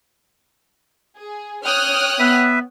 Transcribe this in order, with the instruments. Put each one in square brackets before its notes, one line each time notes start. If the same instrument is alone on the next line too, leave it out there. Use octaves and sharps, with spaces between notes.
[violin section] G#4
[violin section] C#5 G5 D#6 [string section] F6 F#6
[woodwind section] B3 [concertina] B4 E5